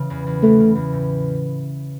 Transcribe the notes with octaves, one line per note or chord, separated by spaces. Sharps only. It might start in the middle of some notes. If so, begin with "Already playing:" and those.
Already playing: C#3 E3
E2
E2
E3 A3
C#3
E2
A2